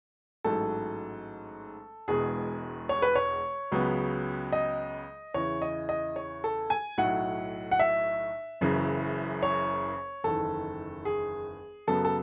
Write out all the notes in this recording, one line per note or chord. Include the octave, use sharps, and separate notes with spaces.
A1 G#2 F#3 A3 A4
E1 E2 B2 G#3 G#4
C#5
B4
C#5
C#2 C#3 F#3 B3
D#5
E2 C#3 E3 C#5
D#5
D#5
C#5
A4
G#5
B1 A2 F#3 F#5
F#5
E5
F#1 F#2 C#3 E3
C#5
F#1 E2 D#3 A4
G#4
F#2 C#3 F#3 B3 A4
A4